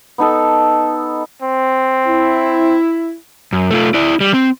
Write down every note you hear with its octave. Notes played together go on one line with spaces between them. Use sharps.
B3 D#4 A4
C4
E4
F#2
A3 F4
E4 D5
G3
C4